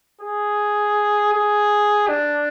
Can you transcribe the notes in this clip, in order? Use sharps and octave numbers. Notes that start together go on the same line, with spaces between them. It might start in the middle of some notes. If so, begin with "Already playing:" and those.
G#4
G#4
D4